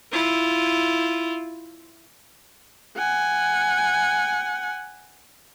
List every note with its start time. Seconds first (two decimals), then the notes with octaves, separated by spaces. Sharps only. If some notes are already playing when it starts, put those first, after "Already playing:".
0.12 E4 F4
2.97 F#5 G#5